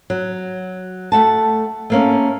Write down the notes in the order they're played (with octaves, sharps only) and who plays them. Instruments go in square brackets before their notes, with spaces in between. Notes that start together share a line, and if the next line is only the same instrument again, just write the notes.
[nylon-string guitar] F#3
A3 F#5 A5
A3 A#3 C#4